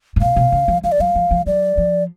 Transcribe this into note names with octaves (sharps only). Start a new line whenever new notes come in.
A2
B2 F5
B2
C#3
F3
F3 F5
D5
F#3 F5
F3
F3
F#3 D5
F3